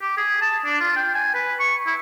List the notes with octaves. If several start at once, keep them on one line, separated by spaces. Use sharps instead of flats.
G4
G#4
A5
D4
F4
G5
G#5
B4
C#6
E4